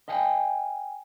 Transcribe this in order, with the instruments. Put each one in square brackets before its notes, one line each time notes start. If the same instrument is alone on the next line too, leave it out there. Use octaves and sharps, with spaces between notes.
[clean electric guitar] D#5 F5 G5 G#5